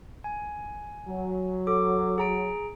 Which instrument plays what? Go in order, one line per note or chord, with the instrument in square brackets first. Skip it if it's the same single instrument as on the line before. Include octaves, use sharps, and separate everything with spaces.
[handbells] G#5
[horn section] F#3
[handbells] A4 D6
G#4 A#5 D7